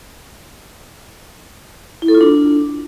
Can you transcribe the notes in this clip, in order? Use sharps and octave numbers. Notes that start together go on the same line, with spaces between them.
E4
A4
F4
D4